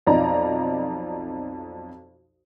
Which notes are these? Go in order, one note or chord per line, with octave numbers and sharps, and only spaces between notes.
B1 F2 D#4 D5 A#5